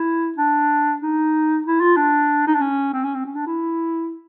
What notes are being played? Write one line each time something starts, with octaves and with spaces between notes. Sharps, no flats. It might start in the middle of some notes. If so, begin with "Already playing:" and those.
Already playing: E4
D4
D#4
E4
F4
D4
D#4
D4
C#4
C4
C#4
C4
C#4
D4
E4